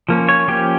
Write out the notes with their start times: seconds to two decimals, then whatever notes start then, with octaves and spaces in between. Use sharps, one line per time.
0.09 F3 A#3 C#4
0.29 C#5
0.48 F3 A#3 C#4 G4